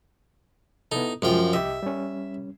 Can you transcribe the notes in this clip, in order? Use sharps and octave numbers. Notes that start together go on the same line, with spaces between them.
B3 D#4 E4 A4
F#2 F3 G#3 F4 G5
C2 G4 D#5 E5
G3 C#4